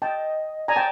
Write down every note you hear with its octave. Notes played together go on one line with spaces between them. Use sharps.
D#5 G5 A5
D5 G#5 A#5
G5 A5